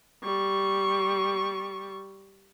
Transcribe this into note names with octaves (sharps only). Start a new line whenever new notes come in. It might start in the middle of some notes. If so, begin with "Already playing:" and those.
G3 C#6